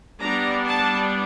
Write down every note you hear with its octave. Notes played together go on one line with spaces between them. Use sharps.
G3 B3 D4 A#5
A5